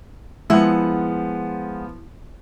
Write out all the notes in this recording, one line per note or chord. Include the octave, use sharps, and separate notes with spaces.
F3 G#3 B3 E4 F#5